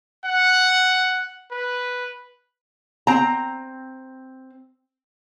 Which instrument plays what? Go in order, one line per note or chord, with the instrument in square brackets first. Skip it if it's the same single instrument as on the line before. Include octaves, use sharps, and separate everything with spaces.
[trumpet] F#5
B4
[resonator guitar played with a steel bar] C4 A#5